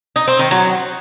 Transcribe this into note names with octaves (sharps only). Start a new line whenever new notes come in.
D#4
C4
D#3
F#3